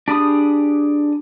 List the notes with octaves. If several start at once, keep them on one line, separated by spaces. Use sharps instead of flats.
D4 G4 G#4 B5 D#6